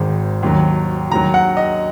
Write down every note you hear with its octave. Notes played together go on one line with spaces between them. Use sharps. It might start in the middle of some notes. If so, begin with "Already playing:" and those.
Already playing: G#1 G#2 D#3
D#2 D#3 F#3
D#2 D#3 F#3 A#5
F#5
D#5